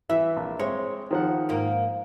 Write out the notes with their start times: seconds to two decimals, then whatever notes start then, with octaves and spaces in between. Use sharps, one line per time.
0.09 E3 E5
0.36 A#1
0.59 G#3 C4 C#5
1.11 D#3 F3 F#5
1.49 G#2 A#3